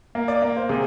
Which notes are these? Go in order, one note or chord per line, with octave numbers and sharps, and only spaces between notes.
A#3
D5
A#3
C5
C3 G#4